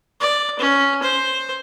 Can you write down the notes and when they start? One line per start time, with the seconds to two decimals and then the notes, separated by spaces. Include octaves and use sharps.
0.20 D5
0.59 C#4
1.02 C5